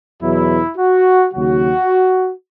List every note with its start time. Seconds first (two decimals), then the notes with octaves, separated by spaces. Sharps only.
0.22 E2 B2 F#3 E4
0.77 F#4
1.33 D#2 C#3 F#3 F#4